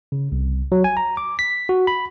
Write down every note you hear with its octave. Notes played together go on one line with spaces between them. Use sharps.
C#3
C2
F#3
G#5
A#5
D6
B6
F#4
B5